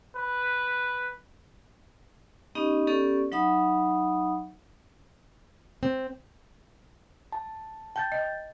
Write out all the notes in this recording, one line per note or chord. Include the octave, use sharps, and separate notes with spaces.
B4
B3 C#4 D#4 G4 D#5
B3 C#4 G4 A4 D5 C#6
F#3 D#4 E5 F#5 B5 D#6
C4
A5
G5 A5 G6 A6
D#5